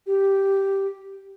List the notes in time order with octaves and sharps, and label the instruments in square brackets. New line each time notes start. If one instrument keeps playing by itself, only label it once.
[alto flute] G4